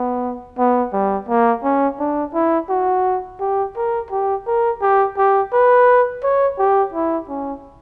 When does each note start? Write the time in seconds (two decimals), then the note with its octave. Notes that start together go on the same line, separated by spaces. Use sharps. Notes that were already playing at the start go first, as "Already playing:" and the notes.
Already playing: B3
0.58 B3
0.93 G3
1.29 A#3
1.63 C#4
1.99 D4
2.34 E4
2.69 F#4
3.40 G4
3.76 A#4
4.10 G4
4.47 A#4
4.81 G4
5.17 G4
5.52 B4
6.23 C#5
6.59 G4
6.94 E4
7.29 C#4